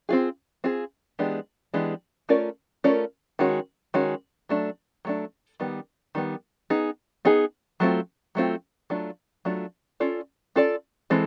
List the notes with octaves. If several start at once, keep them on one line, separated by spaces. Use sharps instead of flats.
C4 F4 G#4
C4 F4 G#4
E3 G#3 B3 D4 G4
E3 G#3 B3 D4 G4
A3 C#4 F4 A#4 D5
A3 C#4 F4 A#4 D5
D#3 G#3 C#4 F#4
D#3 G#3 C#4 F#4
F#3 A3 D4
F#3 A3 D4
D#3 G3 B3
D#3 G3 B3
B3 D#4 G#4
B3 D#4 G#4
F#3 A3 C4 F4
F#3 A3 C4 F4
F#3 A3 D4 F4
F#3 A3 D4 F4
C#4 F4 A4 D5
C#4 F4 A4 D5
E3 G#3 C4 A4